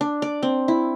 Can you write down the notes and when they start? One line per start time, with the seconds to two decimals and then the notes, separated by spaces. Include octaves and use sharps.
0.01 D4
0.22 D5
0.43 C4
0.68 E4